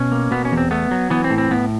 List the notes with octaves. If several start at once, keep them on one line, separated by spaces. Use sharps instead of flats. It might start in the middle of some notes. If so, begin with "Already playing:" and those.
Already playing: B2 C#4
A#3
B2 B3
C#4
E2
C4
A3 B3
F#3
E3 B3
C4
A2
C4
A2 B3